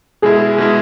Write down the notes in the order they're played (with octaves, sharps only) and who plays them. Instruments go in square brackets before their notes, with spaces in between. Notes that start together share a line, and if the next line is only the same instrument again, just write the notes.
[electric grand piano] B2 G#3 E4 [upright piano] G#4
[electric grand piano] B2 G#3 E4